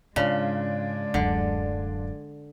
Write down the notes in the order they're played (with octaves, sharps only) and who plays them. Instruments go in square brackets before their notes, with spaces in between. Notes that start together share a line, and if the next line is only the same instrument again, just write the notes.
[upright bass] G#2 [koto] C#3 [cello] G#3 D5 [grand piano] D4 F4
[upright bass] D1 F#2 [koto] D3